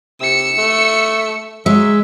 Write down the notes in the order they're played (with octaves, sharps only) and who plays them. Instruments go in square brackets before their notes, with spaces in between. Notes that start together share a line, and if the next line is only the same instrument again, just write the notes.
[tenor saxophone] C3 [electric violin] E6 C#7
[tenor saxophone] A3
[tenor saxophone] F#3 [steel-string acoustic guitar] G#3 [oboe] E5